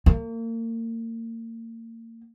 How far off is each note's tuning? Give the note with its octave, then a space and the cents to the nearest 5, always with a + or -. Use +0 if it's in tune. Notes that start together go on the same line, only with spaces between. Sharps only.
A#3 -35